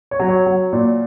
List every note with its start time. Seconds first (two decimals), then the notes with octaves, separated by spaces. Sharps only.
0.11 C#5
0.20 F#3
0.29 C#5
0.46 F#3
0.73 A#2